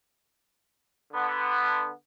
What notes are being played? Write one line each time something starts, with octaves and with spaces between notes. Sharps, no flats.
D3 B3